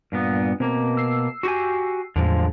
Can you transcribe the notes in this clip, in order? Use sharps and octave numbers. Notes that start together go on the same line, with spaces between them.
G2 A#2 B3
B2 A#3 C4
E6 C7
F#4 G4 G#5
E2 A2 D3 F3 G#3